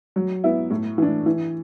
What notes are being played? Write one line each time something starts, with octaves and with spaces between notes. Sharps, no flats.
F#3
B3 E4
A2
E3 D4
E3